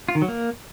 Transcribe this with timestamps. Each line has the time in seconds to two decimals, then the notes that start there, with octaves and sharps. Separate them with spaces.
0.09 F4
0.15 D#3
0.22 F#3
0.28 A#3